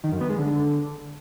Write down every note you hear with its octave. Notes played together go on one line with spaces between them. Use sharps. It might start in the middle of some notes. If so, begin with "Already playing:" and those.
D#3
F#2
B3
G#3
D3